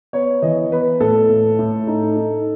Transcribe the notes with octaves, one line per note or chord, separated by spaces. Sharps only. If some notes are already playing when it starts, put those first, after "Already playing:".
B3 C#5
E3 D#5
B3 B4
A2 A4
A2
A2
D#4
D#4